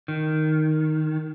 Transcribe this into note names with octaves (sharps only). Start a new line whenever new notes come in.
D#3